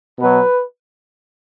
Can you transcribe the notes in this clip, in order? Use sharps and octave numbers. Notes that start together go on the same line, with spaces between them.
B2 F#3 B4